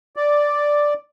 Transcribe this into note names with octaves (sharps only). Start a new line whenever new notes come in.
D5